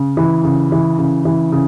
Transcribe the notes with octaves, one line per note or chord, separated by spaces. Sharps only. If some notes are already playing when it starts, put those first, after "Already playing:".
Already playing: C#3
E3
C#3
E3
C#3
E3
C#3